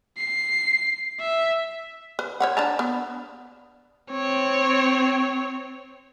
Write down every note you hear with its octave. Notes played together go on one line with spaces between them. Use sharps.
C7
E5
B4
C5 C#5 F#5
D4 A5 A#5
B3
C4 C#5